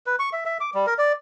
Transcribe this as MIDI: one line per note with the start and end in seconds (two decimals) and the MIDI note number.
0.06 0.16 71
0.19 0.30 85
0.33 0.44 76
0.45 0.58 76
0.60 0.70 86
0.74 0.86 55
0.87 0.94 70
0.98 1.13 74